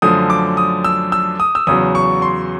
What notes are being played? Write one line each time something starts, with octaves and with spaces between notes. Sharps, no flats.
F#2 D3 F3 A3 D#6
D6
D#6
E6
E6
D#6
E6
E2 C#3 F#3 D#6
C#6
C6